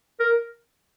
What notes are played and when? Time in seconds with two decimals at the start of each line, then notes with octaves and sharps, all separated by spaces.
0.20 A#4